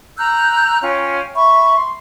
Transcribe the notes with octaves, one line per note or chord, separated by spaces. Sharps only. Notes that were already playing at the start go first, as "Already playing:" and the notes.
A#5 E6 F#6 G6
C#4 F4 G5 G#5
E5 B5 C#6
C6